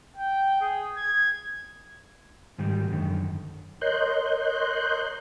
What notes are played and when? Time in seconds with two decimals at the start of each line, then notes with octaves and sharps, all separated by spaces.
0.17 G5
0.61 G#4
0.97 G#6
2.58 G#2 D#3 G3
2.90 F#2 D3 D#3
3.81 A#4 C#5 D#5 C6 F#6 G6